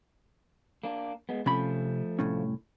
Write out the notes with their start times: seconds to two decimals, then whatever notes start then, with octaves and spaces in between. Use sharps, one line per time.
0.83 A#3 D4
1.29 G#3 B3
1.46 C3 F3 A3 C#4 B5
2.19 C2 A2 C#4